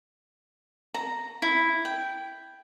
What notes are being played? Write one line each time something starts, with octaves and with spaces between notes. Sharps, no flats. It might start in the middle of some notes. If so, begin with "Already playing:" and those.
A#5
E4
G5